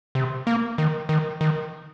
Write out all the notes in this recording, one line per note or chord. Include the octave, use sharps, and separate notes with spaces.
C3
A#3
D#3
D#3
D#3